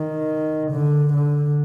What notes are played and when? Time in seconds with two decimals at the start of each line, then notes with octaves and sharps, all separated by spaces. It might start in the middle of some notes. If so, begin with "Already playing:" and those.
Already playing: D#3
0.72 D3
1.13 D3